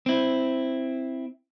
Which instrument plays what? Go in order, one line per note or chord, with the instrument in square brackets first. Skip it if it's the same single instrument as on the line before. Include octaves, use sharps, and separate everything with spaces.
[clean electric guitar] C4 E4